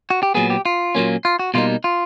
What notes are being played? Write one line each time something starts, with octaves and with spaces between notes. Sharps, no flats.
F#4
G4
A#2 F#3 B3 G#4
G4
F4
A#2 F#3 A#3 C#4
F4
F#4
B2 G3 A#3 D#4 F4
F4